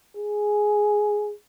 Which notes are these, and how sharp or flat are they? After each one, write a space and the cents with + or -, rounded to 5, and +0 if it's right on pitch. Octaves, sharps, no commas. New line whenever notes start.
G#4 +5